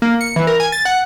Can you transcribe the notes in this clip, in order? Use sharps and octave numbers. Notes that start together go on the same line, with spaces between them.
A#3
C#7
E3
A#4
G#5
A6
F#5